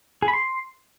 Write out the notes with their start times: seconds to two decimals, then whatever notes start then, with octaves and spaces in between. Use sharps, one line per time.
0.22 G#4
0.28 B5
0.33 C6